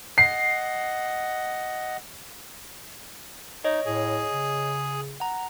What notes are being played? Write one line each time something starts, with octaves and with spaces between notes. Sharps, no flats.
D#5 F#5 C7
D#4 C#5 D#5
A2 G#4
C#3
F#5 A#5